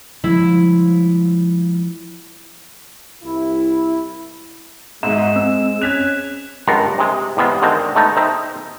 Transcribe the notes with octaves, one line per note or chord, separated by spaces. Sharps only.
F3 G3 G#3 E4
C2 E4
G#1 G#2 G#3 E5 E7
C4 E6
C#4 F#6 G#6 B6 F7
C#2 G2 F4 A#4 F5 F#5
C3 G#3
E2 C3 G#3 B3 F5
D3 D#3 G#3 C4
G#3 A3 B3 D#4
D#4 C5 E5 G5